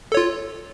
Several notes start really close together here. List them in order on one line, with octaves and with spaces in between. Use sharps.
A4 C#5 F4